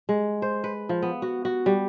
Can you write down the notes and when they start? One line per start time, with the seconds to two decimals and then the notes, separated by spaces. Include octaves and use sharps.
0.09 G#3
0.42 C5
0.64 B4
0.89 F3
1.02 B3
1.22 F#4
1.45 F#4
1.66 G3